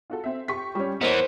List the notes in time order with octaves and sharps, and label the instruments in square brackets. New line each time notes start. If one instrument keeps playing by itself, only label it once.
[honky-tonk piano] F4 F#4 A4
C4 E5
[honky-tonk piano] G4 C#6 [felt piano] B6
[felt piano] G3 C#4
[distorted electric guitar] E3 B3 [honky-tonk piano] A#3 D#5 E7 [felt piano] A#4 C#5 [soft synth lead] C5